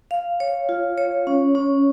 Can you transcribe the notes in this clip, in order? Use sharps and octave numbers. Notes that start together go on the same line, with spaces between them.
F5
C#5
F4
C#5
C#4
C#4